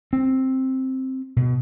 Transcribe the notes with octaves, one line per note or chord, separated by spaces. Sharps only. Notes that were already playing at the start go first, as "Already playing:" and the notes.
C4
B2